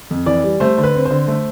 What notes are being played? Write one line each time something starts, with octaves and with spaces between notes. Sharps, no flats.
F2
E3 D5
G3
A3 C5
D3
B4
C4
C5
D3
A3